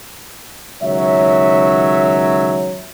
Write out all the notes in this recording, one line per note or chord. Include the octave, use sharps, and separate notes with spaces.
C#2 D#3 F#3 C#5 E5